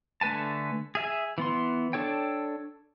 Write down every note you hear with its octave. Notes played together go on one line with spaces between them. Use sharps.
D3 A3 B4 G#5 A5
G#4 E5 G#5
E3 B3 C6
D4 A4 C#5 G5